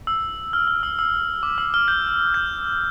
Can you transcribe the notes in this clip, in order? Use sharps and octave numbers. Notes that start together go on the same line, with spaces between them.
E6
F6
F6
E6
E6
D6
E6
F6
G6
G6